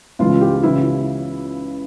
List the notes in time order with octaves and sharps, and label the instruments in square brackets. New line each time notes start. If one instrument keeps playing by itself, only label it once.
[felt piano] C#2 C#3 E3 G#3 F4
G4
C#2 C#3 E3 E4